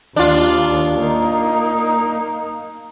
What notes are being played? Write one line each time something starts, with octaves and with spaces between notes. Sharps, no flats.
D#2 D#3 D4 F4
A#3 D#4